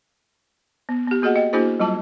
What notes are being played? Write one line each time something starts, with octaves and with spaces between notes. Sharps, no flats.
B3
B3 G4
A#3 F#4 G#4 D#5 F#5
D#5 G5
A#3 D4 E4 F#4 G#4 C5
F#3 G3 F4 A5